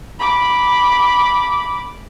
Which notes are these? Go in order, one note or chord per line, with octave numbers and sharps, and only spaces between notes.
B5 D6